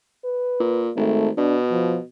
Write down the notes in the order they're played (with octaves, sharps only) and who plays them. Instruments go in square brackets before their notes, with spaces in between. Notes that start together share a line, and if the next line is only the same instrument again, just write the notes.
[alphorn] B4
[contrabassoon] A#2
[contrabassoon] G#1 [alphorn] A3
[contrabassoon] B2 [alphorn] D4
[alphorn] F3